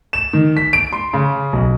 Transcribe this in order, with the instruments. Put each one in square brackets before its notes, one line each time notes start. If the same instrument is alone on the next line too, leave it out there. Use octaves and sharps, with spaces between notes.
[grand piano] E7
D#3
B6
D7
C6
C#3
B1